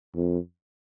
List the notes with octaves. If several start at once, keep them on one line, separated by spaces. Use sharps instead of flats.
F2